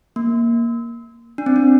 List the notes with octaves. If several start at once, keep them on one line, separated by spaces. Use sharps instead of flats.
A#3
D4
C4
D4